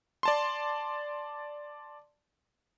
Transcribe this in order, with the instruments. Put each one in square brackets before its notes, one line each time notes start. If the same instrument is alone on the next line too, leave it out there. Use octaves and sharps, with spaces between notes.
[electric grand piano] D5 A5 C6